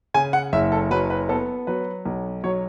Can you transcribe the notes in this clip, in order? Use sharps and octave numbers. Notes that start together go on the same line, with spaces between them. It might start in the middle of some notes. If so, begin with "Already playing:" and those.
C#3 G#5
F#5
F#1 E5
A4
F#3 B4
B4
B3 A4
F#3 B4
B1
F#3 C#5